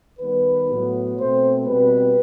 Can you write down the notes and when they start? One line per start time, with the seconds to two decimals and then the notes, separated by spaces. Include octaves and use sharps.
0.19 D#3 G3 B3 B4
0.69 A2 F#3 B3
1.17 B2 A3 C4 C5
1.65 B2 G3 C4 B4